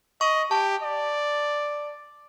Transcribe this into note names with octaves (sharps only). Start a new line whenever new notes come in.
D#5 C#6
G4 A5
D5